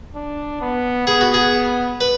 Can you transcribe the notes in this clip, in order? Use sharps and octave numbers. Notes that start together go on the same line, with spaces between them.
D4
B3
B3 G#4
F#4
G#4
B4